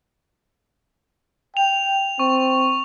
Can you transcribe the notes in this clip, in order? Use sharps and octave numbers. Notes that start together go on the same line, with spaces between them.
G5 F7
C4 C#6